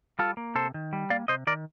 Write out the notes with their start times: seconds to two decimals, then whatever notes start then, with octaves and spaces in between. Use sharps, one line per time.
0.19 G3 F4 A4
0.37 A#3
0.55 C3 A4 C5
0.74 D#3
0.93 G3
1.10 A#3 D5 F5
1.28 C3 C5 D#5
1.47 D#3 A#4 D5